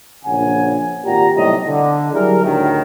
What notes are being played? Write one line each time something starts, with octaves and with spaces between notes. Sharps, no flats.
A#1 C#3 F#5 G#5
G#1 A#2 G4 F#5 A#5
B1 A2 C3 G3 D#5 A#5
D3
F#3 G3 E4 G#4 A#4
D2 A2 D#3